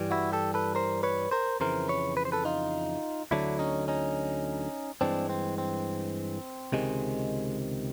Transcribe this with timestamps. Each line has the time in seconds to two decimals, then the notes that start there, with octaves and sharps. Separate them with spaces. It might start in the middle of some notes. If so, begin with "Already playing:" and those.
Already playing: G2 E3 G3
0.11 E4 F#4
0.32 G4 A4
0.54 A4 B4
0.75 A#4 C5
1.03 B4 C#5
1.31 A#4 C5
1.60 F2 C#3 E3 A#4 C5
1.88 B4 C#5
2.17 B4
2.25 C5
2.32 A4 B4
2.45 D#4 F4
3.31 D2 D3 F#3 D4 E4
3.59 C#4 D#4
3.88 C#4 D#4
5.01 G2 E3 G#3 C4 D4
5.29 C4
5.58 C4
6.72 C#2 C3 D#3 G#3